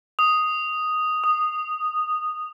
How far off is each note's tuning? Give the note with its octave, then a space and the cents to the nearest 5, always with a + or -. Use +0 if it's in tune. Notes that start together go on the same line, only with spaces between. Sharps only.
D#6 +0
D#6 -10